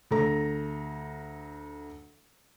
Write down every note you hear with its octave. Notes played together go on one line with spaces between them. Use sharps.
D2 A4 A#5